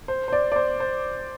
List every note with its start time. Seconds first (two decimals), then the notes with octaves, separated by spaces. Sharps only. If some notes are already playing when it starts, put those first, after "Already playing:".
0.08 C5
0.28 C5
0.33 D5
0.52 D5
0.56 C5
0.80 C5